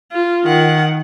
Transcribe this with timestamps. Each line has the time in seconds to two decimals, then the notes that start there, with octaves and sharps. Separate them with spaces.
0.12 F4
0.45 D#3 F#5